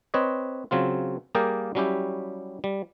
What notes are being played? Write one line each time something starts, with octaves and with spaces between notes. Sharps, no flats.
C4 B4 C#5 D#5
C#3 F#3 C4 F4
G3 A#3 G#4 A#4 D5 G5
F#3 G3 C#4 E4 G4
G3